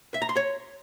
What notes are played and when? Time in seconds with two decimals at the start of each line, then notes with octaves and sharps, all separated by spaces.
0.14 E5
0.22 A#5
0.29 C6
0.36 C#5